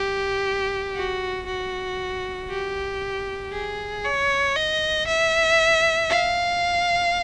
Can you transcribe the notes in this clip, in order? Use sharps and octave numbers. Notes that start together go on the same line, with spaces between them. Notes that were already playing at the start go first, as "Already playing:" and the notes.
Already playing: G4
F#4
F#4
G4
G#4
C#5
D#5
E5
F5